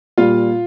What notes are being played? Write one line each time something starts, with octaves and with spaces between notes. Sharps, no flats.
A#2 G3 F4 F5